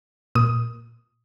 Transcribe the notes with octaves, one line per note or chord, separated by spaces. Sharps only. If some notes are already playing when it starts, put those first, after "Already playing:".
A#2 D#6